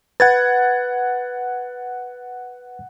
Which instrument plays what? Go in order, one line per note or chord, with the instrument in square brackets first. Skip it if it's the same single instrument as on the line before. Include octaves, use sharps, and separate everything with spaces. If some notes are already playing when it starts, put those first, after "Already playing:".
[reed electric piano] B4 [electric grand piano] F#5 G#6 A6